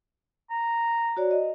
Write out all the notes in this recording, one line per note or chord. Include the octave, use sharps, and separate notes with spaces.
A#5
F#4 C#5 D5
D#5